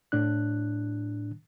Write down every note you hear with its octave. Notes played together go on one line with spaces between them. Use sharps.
A2 D4 F#6